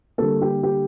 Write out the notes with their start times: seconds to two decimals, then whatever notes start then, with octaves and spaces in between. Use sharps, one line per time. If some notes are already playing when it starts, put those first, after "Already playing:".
0.18 D3 G3 A#3 A4
0.42 G4
0.63 G4